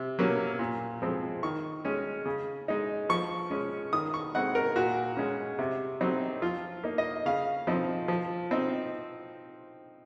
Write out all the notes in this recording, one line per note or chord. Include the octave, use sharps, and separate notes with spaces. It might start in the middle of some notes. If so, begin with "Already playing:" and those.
Already playing: C3
F#3 A#3 C#4
A#2
F3 G#3 C4
D#3 C#6
G#3 C#4
C#3
G#3 D#4
F3 C#6
G#3 C#4
D#3 D#6
C#6
G#3 C4 D#4 F#5
A#4
A#2 F#4
G#3 C#4
C3
F#3 C4 D#4
F3 F4
A#3 D#4
D#5
C#3 F5
F3 C4 D#4
F3
C4 D#4